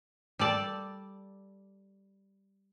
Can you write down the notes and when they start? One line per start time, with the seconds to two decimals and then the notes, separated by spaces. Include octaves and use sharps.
0.39 G3 A4 D5 A5